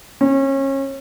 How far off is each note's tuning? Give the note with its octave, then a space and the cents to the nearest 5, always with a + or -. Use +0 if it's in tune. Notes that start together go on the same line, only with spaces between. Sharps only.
C#4 -30